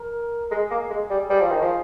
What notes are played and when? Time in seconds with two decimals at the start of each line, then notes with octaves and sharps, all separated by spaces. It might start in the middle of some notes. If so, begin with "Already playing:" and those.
Already playing: A#4
0.51 G#3 G#4
0.71 A#3
0.90 G#3
1.10 G3
1.30 G3
1.40 F3
1.51 D#3
1.62 F3